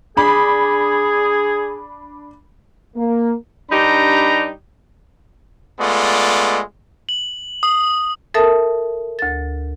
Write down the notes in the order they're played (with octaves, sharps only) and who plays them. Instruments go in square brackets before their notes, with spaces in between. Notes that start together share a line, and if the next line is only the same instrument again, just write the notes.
[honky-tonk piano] D4 B5 [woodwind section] G#4
[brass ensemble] A#3
[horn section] G2 D4 D#4 G4 A#5 B5
[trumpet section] G#3 A3 B3 F4 D5
[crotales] F#7
D#6
[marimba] A4 A#4 E5 A5 D#6
D2 A6